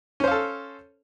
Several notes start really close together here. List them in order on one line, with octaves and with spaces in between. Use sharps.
C#4 C5 F5 A4